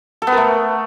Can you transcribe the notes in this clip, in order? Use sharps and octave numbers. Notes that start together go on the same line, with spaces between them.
A4
B3
A#4
A3